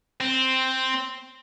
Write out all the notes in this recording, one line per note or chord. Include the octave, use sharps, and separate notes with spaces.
C4